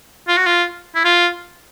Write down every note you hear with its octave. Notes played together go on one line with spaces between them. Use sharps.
F4
F#4
F4
E4
F4